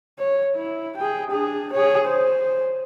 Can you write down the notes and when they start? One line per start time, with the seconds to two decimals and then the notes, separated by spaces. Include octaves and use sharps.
0.19 C#5
0.56 E4
0.97 G#4 G5
1.30 D4 G#4
1.73 G#4 C#5
2.05 C5